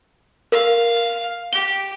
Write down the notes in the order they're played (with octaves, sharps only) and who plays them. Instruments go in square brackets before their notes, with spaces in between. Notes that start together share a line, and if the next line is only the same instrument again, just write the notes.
[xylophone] A#4 [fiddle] F5
[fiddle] G4 [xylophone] G7